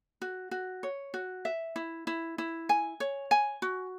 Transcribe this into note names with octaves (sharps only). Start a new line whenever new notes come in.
F#4
F#4
C#5
F#4
E5
E4
E4
E4
G#5
C#5
G#5
F#4